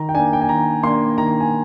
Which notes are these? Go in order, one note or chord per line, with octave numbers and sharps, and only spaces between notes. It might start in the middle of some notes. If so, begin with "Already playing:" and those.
Already playing: D#3 A#5
G5
A#3 D4 G#5
G5
G#5
D#3 A#5
A#3 D4 C6
D#3 A#5
G#5